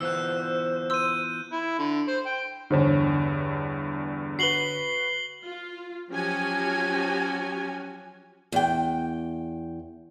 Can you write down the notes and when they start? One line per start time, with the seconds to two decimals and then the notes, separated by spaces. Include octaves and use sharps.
0.01 E3 B3 F4 C5 E6 F#6
0.90 C6 E6 G6 D#7
1.51 E4
1.78 D3
2.08 C5
2.26 G5
2.70 E2 G2 D3 C#5
4.39 F#4 B4 C7 F#7 G7
5.42 F4
6.12 F3 F#3 C#4 F#4 G4 G#5
8.52 E2 G5